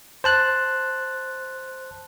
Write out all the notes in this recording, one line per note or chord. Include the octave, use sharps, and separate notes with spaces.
C5 A5 F#6